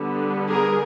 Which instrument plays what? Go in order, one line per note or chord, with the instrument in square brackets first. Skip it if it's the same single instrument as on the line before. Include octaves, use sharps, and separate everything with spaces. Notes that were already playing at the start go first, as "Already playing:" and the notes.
Already playing: [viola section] D3 G3 B3
G#4 A#4